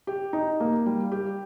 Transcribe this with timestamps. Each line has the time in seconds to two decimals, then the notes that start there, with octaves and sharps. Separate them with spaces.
0.07 G4
0.33 D#4
0.60 A#3
0.86 G3
1.12 G4